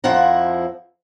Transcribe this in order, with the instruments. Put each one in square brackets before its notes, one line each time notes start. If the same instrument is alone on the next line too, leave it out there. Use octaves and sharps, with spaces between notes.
[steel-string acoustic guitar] F2 F3 E4 F#5 A#5